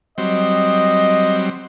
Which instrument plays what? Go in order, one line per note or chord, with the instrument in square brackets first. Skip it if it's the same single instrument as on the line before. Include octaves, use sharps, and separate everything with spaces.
[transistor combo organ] F#3 G3 C4 [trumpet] D#5